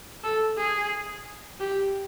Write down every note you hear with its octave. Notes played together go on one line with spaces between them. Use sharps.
A4
G#4
G4